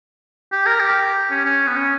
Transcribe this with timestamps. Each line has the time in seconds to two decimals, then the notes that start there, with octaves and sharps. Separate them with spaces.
0.52 G4
0.66 A#4
0.79 G4
1.31 C#4
1.45 C#4
1.67 B3
1.76 C#4